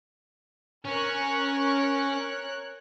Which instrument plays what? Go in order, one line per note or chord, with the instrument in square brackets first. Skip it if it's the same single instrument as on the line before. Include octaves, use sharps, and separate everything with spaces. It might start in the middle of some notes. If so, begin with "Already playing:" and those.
[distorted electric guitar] C#4 [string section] A#4 C#5 F#6